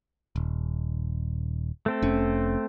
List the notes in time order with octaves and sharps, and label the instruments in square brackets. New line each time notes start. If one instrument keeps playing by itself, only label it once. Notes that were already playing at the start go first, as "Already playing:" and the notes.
[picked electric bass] D#1
[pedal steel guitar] A3 C4 A4
[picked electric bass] F1 C#4